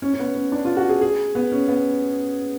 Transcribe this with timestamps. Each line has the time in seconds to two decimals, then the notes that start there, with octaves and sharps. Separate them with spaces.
0.02 C#4
0.14 C#4
0.19 B3
0.35 C#4
0.52 D4
0.65 F4
0.77 F#4
0.89 G#4
1.01 G#4
1.35 B3
1.52 C#4
1.68 B3